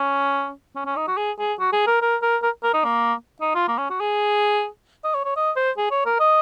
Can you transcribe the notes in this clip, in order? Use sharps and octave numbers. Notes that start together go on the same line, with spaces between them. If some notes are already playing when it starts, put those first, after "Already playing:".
Already playing: C#4
C#4
C#4
D#4
F#4
G#4
G#4
F#4
G#4
A#4
A#4
A#4
A#4
A#4
D#4
A#3
D#4
F4
A#3
C#4
F#4
G#4
D#5
C#5
C#5
D#5
C5
G#4
C#5
A#4
D#5